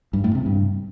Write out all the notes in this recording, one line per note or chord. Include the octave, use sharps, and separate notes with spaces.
G2
A2
C3
G2